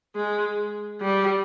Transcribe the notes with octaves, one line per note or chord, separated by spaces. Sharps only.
G#3
G3